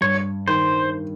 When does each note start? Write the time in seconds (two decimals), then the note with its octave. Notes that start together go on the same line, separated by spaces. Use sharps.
0.01 G2 C#5
0.48 D#3 C5